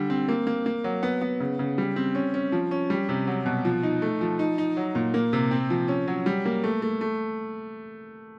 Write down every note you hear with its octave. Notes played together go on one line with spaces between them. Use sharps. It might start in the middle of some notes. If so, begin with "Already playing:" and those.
Already playing: D3 G3
C4
A#3
A#3
A#3
F#3
B3
B3
C#3
C#3
G3
C4
C#4
C#4
F3
C#4
G3
C3
F#3
B2
F3
D#4
A3
F3
D#4
D#4
F#3
A#2
A#3
C3
C4
F3
C#4
F#3
G3
A#3
A3
A3
A3